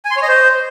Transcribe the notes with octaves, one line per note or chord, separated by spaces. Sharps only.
G#5
C6
C#5
D#5
C5